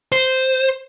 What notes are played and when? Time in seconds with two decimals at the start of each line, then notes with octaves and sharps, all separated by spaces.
0.12 C5